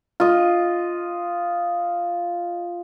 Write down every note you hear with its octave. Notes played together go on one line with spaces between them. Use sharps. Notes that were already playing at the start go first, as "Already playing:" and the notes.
F4 D#5